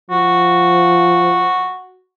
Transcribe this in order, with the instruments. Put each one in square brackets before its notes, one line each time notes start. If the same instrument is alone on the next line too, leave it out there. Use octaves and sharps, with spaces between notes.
[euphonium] F3 [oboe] F#4